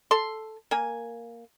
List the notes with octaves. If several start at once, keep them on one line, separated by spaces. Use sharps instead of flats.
A4 C6
A#3 G#5